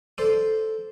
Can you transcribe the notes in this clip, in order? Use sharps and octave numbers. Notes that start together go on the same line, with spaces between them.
A4 C5 D5